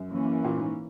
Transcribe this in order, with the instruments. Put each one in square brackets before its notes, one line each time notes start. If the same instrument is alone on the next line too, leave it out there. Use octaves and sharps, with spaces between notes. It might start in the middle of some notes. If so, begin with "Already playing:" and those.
Already playing: [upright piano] F#2
[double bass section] E3 A#3 C#4
[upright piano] A#2
G#2